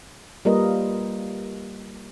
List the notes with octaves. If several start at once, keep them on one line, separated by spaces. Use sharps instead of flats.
G3 A#3 F4 A#4 B4 D#5